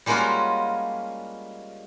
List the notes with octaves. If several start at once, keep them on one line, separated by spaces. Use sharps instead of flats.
G3 G#3 A#3 C#4 F4 F#4